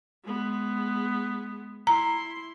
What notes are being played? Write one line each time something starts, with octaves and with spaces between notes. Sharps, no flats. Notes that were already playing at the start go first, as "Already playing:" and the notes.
G#3 B3
E4 A#5 C6